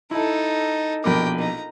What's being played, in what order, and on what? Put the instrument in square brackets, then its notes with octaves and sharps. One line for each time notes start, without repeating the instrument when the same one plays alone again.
[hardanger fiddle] D#4 A4 [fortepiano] E4 A5
[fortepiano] A#1 B2 D6 [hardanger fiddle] A#4 G5
[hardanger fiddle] D#4 A#5